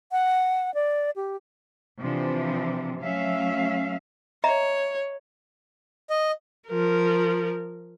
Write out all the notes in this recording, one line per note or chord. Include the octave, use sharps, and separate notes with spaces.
F#5
D5
G4
C3 E3 F3 D4
F#3 A3 C#4 E5 F5
C#5 D#5 E5 A#5
D#5
F3 A#4